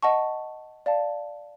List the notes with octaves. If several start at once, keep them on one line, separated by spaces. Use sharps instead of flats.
D#5 F#5 A5 C#6
D5 F5 A5